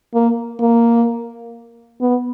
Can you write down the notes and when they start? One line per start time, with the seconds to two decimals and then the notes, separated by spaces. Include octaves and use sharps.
0.14 A#3
0.60 A#3
2.01 B3